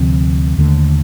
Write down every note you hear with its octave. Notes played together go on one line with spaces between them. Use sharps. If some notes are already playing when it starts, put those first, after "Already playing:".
Already playing: D2 C3 F3 C4
D#2 D3 A3